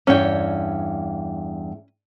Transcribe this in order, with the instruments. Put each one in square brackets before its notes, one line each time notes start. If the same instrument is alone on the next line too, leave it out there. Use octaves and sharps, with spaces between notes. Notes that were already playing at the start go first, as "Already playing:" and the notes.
[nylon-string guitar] E2 G2 G5 [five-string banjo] C#4